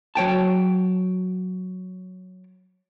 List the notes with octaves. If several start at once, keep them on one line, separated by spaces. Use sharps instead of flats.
F#3 C#5 G5 A5